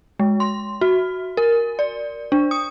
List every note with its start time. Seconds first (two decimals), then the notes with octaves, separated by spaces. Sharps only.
0.20 G#3
0.40 C6
0.81 F#4
1.37 A#4
1.79 D5
2.32 D4
2.51 D#6